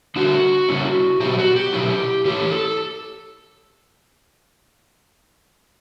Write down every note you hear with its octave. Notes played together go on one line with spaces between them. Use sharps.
D3 G3 D4 F#4
C#3 G3 C#4 E4
B2 F#3 B3 G4
F#4
G4
B2 F#3 C#4 E4
A2 E3 A3 C#4 E4 G4
A4